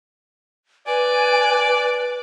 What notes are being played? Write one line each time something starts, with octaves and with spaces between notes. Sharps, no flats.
B4 D5 G#5